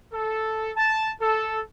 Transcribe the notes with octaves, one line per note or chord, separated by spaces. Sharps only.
A4
A5
A4